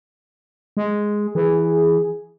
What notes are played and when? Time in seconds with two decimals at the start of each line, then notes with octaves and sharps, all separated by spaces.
0.77 G#3
1.35 E3 G#4